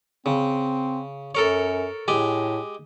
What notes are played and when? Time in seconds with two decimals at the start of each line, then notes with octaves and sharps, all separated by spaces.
0.26 C#3 C4
1.35 F#2 A4 A#4 C#5
2.08 A2 G#3 G4 G#5